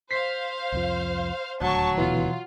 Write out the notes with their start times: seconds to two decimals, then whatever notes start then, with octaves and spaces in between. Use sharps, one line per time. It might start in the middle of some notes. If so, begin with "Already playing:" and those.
0.11 C5 F5 B6 C7
0.72 C2 F2 F3
1.62 D#1 D2 F#3 A5 C#6
1.98 B2 E3 F4